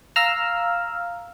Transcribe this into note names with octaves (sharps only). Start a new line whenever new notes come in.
F5 A#5 E6 F6